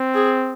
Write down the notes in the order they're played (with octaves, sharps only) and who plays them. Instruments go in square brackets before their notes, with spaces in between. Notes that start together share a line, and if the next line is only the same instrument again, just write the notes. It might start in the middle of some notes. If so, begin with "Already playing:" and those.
Already playing: [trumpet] C4
[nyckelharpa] G#4